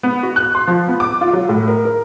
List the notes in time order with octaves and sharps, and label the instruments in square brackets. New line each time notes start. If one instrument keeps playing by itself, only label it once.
[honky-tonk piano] B3
F#4
F#6
C6
F3
B3
D6
F4
F#3
A2
A#4
A#4